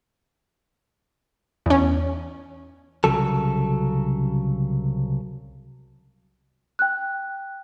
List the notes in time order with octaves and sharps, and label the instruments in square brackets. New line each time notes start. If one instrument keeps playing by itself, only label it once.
[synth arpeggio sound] E2 C#4
[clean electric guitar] C2 C#3 F#3 A4
[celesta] G5 F#6